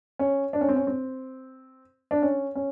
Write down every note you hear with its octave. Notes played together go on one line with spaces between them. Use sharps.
C#4
D4
C#4
C4
C#4
C4
D4
C#4
C#4